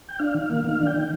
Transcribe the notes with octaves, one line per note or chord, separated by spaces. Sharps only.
G5
D4 F5
D#3
A#3
D#3 F5
D4
G5
D#3